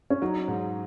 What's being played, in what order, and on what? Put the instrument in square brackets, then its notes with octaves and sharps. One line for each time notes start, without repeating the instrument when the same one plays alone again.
[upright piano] C#4
[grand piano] F#3 [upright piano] D#4
[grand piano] G#2